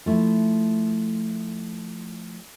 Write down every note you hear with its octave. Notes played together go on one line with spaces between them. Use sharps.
F3 A3 E4